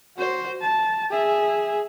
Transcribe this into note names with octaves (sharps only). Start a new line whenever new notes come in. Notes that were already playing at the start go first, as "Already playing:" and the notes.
F#4 C5
A5
G#4 E5